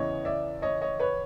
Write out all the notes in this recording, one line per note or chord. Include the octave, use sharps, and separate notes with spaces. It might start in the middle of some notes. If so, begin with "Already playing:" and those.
Already playing: E2 C#3 E3 C#5 D#5
D5 E5
C#5 D#5
C#5 D#5
B4 C#5